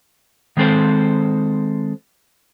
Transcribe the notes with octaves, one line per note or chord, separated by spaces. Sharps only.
D#3 G#3 C4 A4 C5